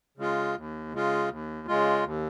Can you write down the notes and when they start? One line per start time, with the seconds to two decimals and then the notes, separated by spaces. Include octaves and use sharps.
0.17 C#3 G#3 F4
0.56 D#2
0.93 C#3 G#3 F4
1.29 D#2
1.67 C#3 G#3 F4
2.04 D#2